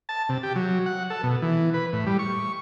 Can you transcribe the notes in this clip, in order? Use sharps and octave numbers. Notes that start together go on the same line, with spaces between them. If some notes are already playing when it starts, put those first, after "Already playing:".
A5
C3
G4
F#3
F#5
A4
B2
E3
B4
A2
G3
C#6